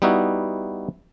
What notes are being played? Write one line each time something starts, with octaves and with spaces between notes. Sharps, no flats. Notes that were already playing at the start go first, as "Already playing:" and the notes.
G3 B3 D#4 E4 F#4